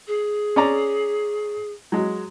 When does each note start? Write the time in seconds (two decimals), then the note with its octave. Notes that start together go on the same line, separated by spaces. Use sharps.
0.07 G#4
0.56 C#4 D5 A#5
1.92 F#3 G#3